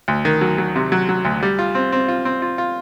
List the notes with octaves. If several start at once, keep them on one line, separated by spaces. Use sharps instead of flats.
D2
D#3
F#3
F#3
C3
F#3
F#3
D2
G3
F4
C4
C4
F4
C4
F4
F4